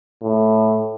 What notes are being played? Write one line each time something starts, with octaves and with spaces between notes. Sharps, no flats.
A2